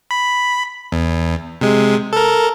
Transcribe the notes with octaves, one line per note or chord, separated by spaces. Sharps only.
B5
E2
C3 G#3
A4 A#4